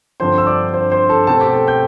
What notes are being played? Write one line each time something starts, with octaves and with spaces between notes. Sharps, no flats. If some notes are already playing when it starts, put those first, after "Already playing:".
G2 D3 F3 C4 C5 C6
E6
D5 D6
C5 C6
C5 C6
A4 A5
B2 A3 C4 A4 A5
G4 G5
A4 A5
G5 G6